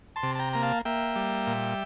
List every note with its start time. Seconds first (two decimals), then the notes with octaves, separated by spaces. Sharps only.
0.16 A5 C6
0.23 C3
0.35 A5
0.39 G5 A#5
0.53 A#3 A#5
0.62 F5 A5
0.85 A#3 E5 G5
1.16 G3
1.47 A#2